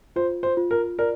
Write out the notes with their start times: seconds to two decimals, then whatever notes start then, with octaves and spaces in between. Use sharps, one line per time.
0.16 F4 C5
0.43 C5
0.57 F4
0.71 A#4
0.99 A#4 D5